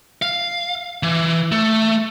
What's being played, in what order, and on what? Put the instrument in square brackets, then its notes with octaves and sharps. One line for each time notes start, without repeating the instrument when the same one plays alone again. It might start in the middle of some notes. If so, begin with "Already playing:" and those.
[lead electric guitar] F5
E3
A3